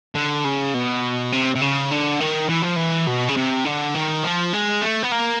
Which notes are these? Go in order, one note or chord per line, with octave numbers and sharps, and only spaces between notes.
D3
C#3
B2
C3
C3
C#3
D3
D#3
E3
F3
E3
B2
C#3
C3
D3
D#3
F3
G#3
A3
B3
A#3